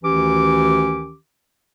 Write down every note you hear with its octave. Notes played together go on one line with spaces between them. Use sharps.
D2 D#3 E3 C#4 G4 D6